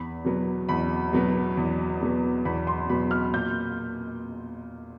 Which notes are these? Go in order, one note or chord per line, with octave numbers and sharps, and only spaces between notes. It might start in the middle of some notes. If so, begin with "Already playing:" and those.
Already playing: E2 B5
B2 F#3 B3
E2 B5
B2 F#3 B3
E2
B2 F#3 B3
E2 B5
C6
B2 F#3 B3 B5
F6
A#2 G6